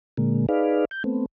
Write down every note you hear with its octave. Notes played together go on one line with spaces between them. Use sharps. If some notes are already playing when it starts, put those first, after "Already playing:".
A#2 D3 G#3 A#3
D#4 G#4 B4 D5 F5
G6
A3 B3 C4